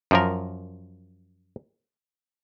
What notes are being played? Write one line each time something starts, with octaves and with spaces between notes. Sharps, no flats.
F#2 F3 A#4